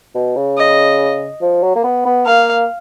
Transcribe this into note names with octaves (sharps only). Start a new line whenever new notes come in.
B2
C#3
D#5
F3
F#3
A#3
B3
B3
A#3 F5